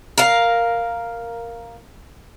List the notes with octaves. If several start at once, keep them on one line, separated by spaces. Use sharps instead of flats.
A#4 F5